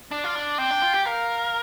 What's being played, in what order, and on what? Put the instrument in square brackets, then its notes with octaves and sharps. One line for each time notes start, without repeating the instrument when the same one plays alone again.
[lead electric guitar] D4 [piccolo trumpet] D5
[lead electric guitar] F4
D4
[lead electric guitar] C4 [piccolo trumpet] G5
[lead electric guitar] D4
F4
G4
[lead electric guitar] A#4 [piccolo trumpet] F5